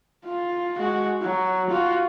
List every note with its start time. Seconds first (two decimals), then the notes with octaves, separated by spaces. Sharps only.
0.25 F4
0.78 G#3 F#4
1.22 F#3
1.70 F4 F#4